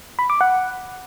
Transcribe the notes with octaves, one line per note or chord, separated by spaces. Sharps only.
B5
D6
F#5